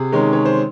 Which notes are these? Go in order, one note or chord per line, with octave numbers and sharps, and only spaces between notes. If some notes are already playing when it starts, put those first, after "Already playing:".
Already playing: C3 G#4
D#3 G#3 C#4
C#5
C5